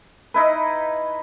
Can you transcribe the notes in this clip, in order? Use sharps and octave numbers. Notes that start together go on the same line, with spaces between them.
D#4 E4 B4